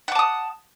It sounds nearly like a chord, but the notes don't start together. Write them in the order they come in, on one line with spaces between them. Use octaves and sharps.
F#5 D6 A5 D#6